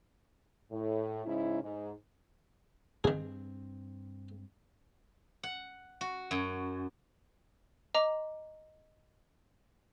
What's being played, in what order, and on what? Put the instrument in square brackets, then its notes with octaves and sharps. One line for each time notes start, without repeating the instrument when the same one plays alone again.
[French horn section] A2
G#2 C#3 C#4 D#4 E4
G#2
[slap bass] G2 C4 [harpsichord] D#3 G#4
[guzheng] F#5
F#4
F#2
[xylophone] D#5 A#5 D6